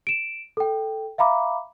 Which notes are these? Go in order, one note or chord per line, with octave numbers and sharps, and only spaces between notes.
D7 E7
A4 G5
E5 F5 A#5 B5 D6